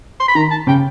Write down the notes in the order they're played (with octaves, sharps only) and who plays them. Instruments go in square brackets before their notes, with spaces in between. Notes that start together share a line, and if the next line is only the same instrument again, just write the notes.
[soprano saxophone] C6
B5
[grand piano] D#3 [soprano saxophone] A#5
[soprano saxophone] A5
[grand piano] C#3 [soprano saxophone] G5